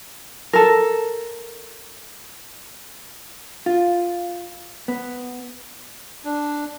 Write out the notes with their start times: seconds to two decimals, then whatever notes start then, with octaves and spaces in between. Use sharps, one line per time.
0.53 A4 A#4
3.66 F4
4.88 B3
6.25 D4